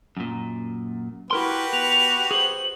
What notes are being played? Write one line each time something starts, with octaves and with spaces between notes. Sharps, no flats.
F#2 A#2
E4 F#4 G4 A#4 B4 C6
B3 F7
G#4 C5 F#7